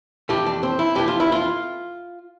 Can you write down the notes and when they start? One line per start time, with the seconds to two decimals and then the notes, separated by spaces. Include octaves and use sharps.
0.29 F2 E3 A3 G4
0.46 D4
0.63 C4
0.79 E4
0.95 F2 E3 A3 G4
1.08 F4
1.20 E4
1.32 F4